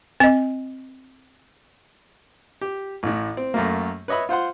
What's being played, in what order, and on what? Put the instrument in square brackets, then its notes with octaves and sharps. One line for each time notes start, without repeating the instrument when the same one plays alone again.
[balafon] C4 D#5
[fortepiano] G4
A1 A2
C4
F#2 A3 A#3
B4 C#5 D#5 E5 B5
F4 C5 F#5 C6